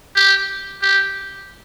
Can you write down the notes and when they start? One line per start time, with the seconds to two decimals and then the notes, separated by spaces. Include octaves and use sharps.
0.16 G4
0.82 G4